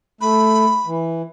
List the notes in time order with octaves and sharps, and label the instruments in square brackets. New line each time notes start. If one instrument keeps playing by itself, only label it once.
[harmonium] A3 [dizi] B5
[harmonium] E3